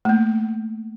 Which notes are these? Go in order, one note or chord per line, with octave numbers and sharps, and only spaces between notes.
A3
A#3